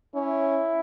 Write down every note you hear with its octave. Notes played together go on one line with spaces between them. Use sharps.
C#4 E4